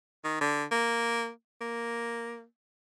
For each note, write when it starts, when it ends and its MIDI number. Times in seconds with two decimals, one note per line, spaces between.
0.24 0.37 51
0.41 0.64 50
0.71 1.30 58
1.61 2.44 58